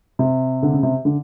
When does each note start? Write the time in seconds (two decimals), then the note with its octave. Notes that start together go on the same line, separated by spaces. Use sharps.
0.19 C3
0.63 D3
0.73 C#3
0.83 C3
1.05 D3